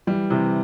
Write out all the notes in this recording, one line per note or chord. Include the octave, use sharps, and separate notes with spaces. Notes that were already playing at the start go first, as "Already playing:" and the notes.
E3 G3
C3 E3